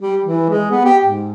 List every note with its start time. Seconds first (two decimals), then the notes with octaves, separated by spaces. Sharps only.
0.01 G3
0.24 E3
0.49 G#3
0.71 B3
0.85 G4
1.05 G#2